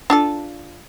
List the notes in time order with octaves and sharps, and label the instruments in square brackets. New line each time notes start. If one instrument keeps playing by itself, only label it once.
[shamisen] D4 F4 A4